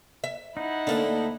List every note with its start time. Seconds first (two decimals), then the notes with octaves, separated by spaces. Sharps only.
0.24 E5
0.57 D#4 E4 F#5
0.87 D2 D3 A#3 D4 D#5